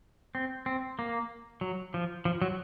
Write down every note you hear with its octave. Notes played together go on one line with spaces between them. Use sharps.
C4
C4
A#3
F#3
F3
F3
F#3